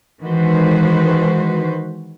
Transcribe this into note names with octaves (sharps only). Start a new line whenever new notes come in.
D#3 E3 G#3 F#4 B4 C5